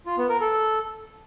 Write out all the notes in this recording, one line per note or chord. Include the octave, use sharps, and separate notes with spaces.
F4
B3
A#4
A4